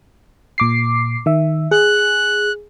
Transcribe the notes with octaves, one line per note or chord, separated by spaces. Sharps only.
A#2 D6 C7
D#3 E5
G#4 F#6